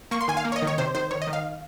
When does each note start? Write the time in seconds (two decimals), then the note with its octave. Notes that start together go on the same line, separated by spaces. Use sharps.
0.11 A#3 C#6
0.21 C6
0.28 D#3 G#5
0.37 F5
0.45 A#3
0.52 C#5
0.56 D#5
0.62 D#3
0.67 C#5
0.78 C3 C5
0.95 D#3 C5
1.11 D#3 C#5
1.22 D#5
1.27 D#3
1.33 F5